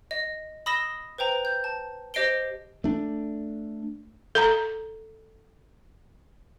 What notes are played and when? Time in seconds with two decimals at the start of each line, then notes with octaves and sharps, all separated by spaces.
0.11 D#5
0.66 B5 D#6 E6 A#6 E7 G7
1.18 B4 C5 G5 A#5
1.45 G6
1.64 A5
2.14 G4 C5 D#5 C7 D7 G7
2.84 A3 D4
4.35 A4 A#5